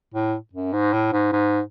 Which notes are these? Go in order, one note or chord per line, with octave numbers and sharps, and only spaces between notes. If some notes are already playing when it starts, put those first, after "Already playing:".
A2
F#2
G#2
A2
G#2
G#2